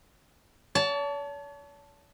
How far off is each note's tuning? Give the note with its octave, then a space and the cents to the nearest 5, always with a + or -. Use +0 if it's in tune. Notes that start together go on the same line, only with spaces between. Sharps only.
C#5 +45 A5 +0